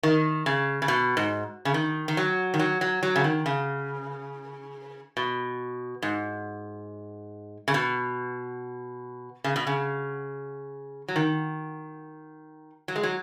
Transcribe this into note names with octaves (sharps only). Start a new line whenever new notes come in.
D#3
C#3
C#3
B2
G#2
C#3
D#3
D#3
F#3
D#3
F#3
F#3
F#3
C#3
D#3
C#3
B2
G#2
C#3
B2
C#3
B2
C#3
F#3
D#3
F#3
G#3
F#3